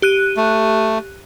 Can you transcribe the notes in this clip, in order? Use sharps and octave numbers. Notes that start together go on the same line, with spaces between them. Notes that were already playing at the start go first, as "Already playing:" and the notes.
G4 F#6 D#7
A3